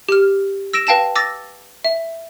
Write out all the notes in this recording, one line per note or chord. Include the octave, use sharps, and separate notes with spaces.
G4 F6
E6 A#6 D7 E7
B4 F5 G5 A5 A#6 E7
D6 E6 A6 A#6
E5